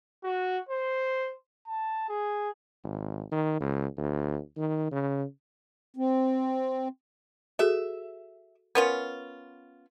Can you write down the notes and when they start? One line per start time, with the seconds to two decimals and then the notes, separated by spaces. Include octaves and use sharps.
0.24 F#4
0.69 C5
1.67 A5
2.09 G#4
2.84 G#1
3.31 D#3
3.60 C#2
3.97 D2
4.57 D#3
4.91 C#3
5.97 C4
7.59 F#4 G#4 A4 E5
8.75 B3 C#4 F4 A#4